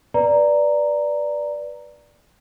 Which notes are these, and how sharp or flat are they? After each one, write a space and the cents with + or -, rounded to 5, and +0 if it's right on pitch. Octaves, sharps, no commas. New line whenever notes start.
B4 -15 D5 +0 A#5 -5